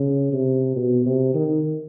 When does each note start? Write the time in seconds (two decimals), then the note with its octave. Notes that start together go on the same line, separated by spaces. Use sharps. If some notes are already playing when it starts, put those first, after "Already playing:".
Already playing: C#3
0.33 C3
0.76 B2
1.06 C3
1.34 D#3